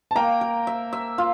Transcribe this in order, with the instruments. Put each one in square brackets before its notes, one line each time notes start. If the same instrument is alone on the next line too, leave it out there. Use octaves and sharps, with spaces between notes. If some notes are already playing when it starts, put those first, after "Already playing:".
[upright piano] A5
[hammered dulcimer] A#3 [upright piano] G5 A#5
[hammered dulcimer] A#4
E5
E5
[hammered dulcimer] F4 [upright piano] F5